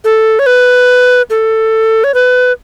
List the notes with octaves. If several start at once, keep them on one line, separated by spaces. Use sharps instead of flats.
A4
C#5
B4
A4
C#5
B4